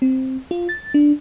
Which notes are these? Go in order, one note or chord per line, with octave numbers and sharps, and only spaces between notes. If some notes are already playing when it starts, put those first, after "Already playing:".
C4
F4
A6
D4